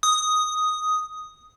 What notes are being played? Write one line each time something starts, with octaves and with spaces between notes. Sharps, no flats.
D#6